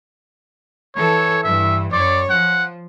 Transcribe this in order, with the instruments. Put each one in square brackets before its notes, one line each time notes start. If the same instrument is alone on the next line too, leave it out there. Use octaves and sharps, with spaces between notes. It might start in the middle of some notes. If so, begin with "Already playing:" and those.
[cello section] E3 A4 [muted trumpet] C#5
[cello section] G2 E3 [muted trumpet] E5
[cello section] F#2 C#5 [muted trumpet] D5
[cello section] F3 [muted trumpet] F#5